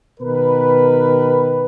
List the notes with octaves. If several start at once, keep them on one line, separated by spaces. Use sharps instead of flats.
B2 D#3 A#4 B4